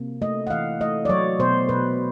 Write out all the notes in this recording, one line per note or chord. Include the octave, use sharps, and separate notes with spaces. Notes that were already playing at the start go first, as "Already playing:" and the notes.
Already playing: C3 A#3
A3 D#5
F#5
E3 F5
A3 D#5
D5
F#3 C#5
B2 C5
B2 B4